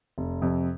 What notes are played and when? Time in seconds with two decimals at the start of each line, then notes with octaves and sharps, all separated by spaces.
0.18 F1
0.42 F2 C3